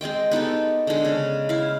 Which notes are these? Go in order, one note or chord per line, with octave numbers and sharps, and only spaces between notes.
G#3 C4 D#5 G5
B3 D#4 G4 A4
D3 G#3
C#3
E4 F5